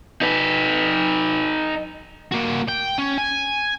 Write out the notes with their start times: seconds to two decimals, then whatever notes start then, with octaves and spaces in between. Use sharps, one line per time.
0.21 D#4 B4
2.32 A#3 F#4
2.68 G5
2.98 C#4
3.18 G#5